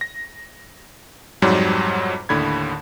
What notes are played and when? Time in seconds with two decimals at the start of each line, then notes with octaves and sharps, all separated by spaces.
0.01 A#6
1.42 F2 G#2 F#3 G3
2.29 D#2 A2 D3 B5 G#6